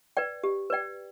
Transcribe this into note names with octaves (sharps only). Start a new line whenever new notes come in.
B4 D5 G5
G4
B4 D5 G5